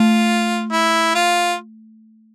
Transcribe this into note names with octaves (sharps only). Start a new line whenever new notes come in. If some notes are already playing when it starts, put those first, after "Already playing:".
Already playing: A3 F4
E4
F4